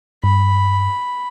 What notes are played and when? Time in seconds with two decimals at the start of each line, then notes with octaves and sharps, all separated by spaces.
0.24 G2 B5